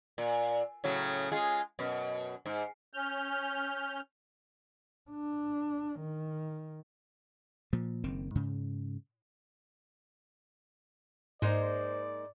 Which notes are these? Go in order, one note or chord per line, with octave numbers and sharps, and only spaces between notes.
A#2
A2 C#3 F#3
G#3 F4 G#4
F#2 B2
G#2
C#4 F6 G6
D4
D#3
A#2 F3
F#1 D#3 C4
G#2 C#3
G#2 G#3 A#3 D#4 C5 D5